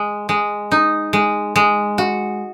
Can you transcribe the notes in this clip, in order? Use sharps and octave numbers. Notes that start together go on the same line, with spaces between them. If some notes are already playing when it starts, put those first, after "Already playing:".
Already playing: G#3
G#3
D#4
G#3
G#3
F#4